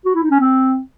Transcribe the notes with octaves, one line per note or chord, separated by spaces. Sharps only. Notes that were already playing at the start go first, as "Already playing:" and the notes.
F#4
E4
D#4
C#4
C4